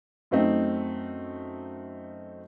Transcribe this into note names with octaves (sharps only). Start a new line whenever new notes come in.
F#2 A3 C4 D#4